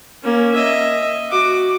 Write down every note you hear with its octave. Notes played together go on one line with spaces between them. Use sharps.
A#3 C#4
D#5 E5
F#4 D6